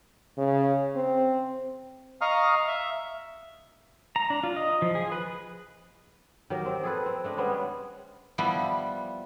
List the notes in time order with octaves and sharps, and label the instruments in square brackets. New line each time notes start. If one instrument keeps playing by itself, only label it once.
[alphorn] C#3
C4
[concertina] D#5 F5 A#5 C#6 D#6 F6
E5
[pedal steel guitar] A#5
D4
F4
D#5
F3
G#4
B4
[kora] D#3 F#3 G4 A#4
C4
G#4 A4 B4
C4
A3 D4 D#5
G3 G#3 B3 C#4
[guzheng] F3 G3 B3 E4